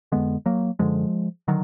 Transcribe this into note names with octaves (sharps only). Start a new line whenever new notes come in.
F2 D3 G#3 B3
F#3 A#3
F#2 D3 F3 G#3
D3 D#3 F#3